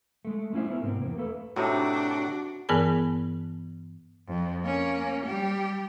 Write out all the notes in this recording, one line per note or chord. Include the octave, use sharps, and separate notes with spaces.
G#3 A3
A3 C#4 E4 C5 E5
B3 E4 A#4
G#2 C3 C4
E2 A#3
A3 A#3 A4 B4
A2 C3 D4 D#4 F#4
G2 E3 B3 G#4 A#4 B5
F2
A#3 C#4
G3 G4